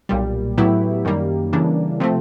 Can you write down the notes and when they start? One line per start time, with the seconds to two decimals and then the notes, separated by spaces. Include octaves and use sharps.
0.09 B1 A#2 G3
0.58 A2 F#3 B3 E4 G4
1.05 F#2 D#3 G3 A#3
1.53 C#3 E3 G3 A#3 D4
2.00 C3 F3 A3 C4